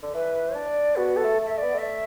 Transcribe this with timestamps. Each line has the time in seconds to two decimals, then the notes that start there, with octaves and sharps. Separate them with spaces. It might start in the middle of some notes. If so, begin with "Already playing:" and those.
0.03 D3
0.14 E3 B4
0.55 D4 D5
0.96 B3 F#4
1.17 A4
1.24 A3
1.46 A3 E5
1.58 B3 D5
1.74 A3 E5